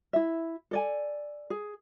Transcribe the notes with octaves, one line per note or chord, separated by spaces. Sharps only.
E4 E5
A4 D5 G#5
G#4